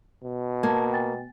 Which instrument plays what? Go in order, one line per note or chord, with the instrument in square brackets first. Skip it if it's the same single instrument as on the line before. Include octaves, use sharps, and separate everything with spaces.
[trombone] B2
[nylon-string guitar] A#3 [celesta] A5 G#6
[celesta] G5 G#5 A6